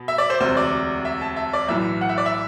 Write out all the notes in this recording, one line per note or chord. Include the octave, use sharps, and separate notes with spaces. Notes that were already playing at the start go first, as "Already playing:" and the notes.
Already playing: B2
E5
D5
C5
E1 D2 C3 C5
D5
E5
A5
E5
D5
B1 A2 E3 E5
F#5
E5
D5
E5